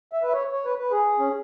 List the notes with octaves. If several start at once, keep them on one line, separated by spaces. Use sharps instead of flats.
E5
B4
E5
C#5
C#5
B4
B4
G#4
C#4